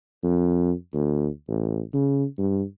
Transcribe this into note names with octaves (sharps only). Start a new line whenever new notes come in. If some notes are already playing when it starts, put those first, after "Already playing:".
F2
D2
A1
C#3
G2